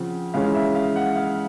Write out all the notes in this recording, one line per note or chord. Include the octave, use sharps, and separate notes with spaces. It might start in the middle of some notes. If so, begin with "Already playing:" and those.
Already playing: C#3 F3 C4 F#5
C#3 E3 G#3 C#4 F5
E5
F5
F#5
F5